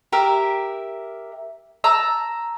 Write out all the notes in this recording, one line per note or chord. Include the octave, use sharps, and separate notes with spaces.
G4 A#4 E5
A5 A#5 E6